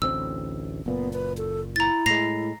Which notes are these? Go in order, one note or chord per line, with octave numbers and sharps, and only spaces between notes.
A1 D2 C4 E6
F#1 A#2 B3
B4
A4
E4 A#5 A6
A2 G#3 A#6 C7 F7